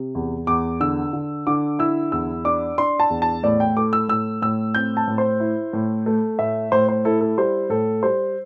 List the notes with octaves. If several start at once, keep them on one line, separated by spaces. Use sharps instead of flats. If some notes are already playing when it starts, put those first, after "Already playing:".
Already playing: C3
E2
E2 D6
D3 E6
D3
D3 D6
E4 E6
E2 E6
D4 D6
D4 C6
A5
E2
A5
A2 D5
G5
A3 D6
E6
A2 E6
A2 E6
C4 G6
A5
A2
C5
E4
A2
A3
A2 E5
A2 C5
C5
E4 A4
A4
G3 C5
A2 A4
G3 C5